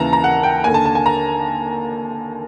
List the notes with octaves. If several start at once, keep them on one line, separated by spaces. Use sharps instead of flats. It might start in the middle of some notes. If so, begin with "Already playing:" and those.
Already playing: D#2 C#3 E3 A5 A#5
A#5
F#5
G5
D#2 D3 G#5
A5
A5
G#5
A#5